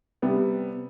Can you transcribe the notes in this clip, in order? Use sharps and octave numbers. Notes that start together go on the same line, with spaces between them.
C3 G3 B3